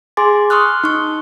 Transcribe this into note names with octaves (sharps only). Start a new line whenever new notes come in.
G#4 G#5 C6 D6 A6
C6 C#6 D#6 F6 F#6
D#4 C#6